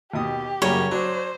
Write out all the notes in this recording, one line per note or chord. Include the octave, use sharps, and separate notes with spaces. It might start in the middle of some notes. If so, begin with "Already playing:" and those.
D#2 B2 G4 D#6
F#2 C#3 F#3 G3 A#3 C#5
F#3 D4 C5